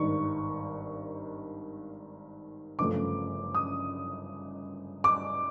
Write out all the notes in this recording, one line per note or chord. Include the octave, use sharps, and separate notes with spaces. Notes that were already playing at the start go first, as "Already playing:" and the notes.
Already playing: G#1 G2 D#3 C#6
G1 F#2 C#3 F3 A3 D6
D#6
D6